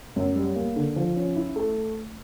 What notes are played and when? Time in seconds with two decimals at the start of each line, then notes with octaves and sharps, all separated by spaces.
0.16 F#2
0.36 G3
0.56 A#3
0.76 D3
0.96 F3
1.16 C#4
1.36 E4
1.56 A3